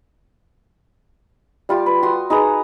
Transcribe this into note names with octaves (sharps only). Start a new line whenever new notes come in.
G3 F4 G4
B4
F#4 C6 D#6
D#4 G#4 B4 A#5